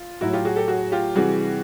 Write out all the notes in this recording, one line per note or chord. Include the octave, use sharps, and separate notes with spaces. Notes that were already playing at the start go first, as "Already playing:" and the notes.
Already playing: F4
A2 F#3 E4 F#4
F4 G4
F#4 G#4
G4 A4
F#4 G#4
F4 G4
C3 E3 G3 F#4 G#4